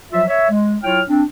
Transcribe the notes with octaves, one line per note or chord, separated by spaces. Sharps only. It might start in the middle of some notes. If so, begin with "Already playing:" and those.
F3 F#3 F4 E5
C#5 E5
G#3
F#3 E4 F4 C#5 G5 F6
C4 D4